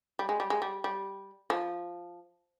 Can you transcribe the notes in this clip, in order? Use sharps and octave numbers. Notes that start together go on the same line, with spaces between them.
G3
G#3
G3
G#3
G3
G3
F3